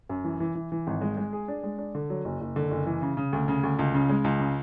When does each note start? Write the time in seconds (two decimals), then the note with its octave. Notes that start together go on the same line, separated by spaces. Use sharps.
0.09 F#2
0.24 E3
0.40 E3
0.55 E3
0.72 E3
0.87 G#1
1.01 G#3
1.17 G#3
1.33 G#4
1.48 D4
1.63 G#3
1.78 D4
1.95 D3
2.10 F#3
2.25 F#1
2.41 F#1
2.56 D3
2.71 F#1
2.87 E3
3.02 C#3
3.17 C#3
3.33 D2
3.48 C#3
3.63 D2
3.79 C#2
3.94 C#3
4.09 G#3
4.24 C#2
4.40 C#3